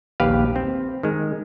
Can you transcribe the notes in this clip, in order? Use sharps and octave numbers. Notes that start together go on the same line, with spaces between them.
A#1 D#2 G4 B4 F5
C4
D#3 G#3